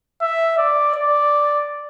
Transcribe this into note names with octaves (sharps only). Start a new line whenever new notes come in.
E5
D5
D5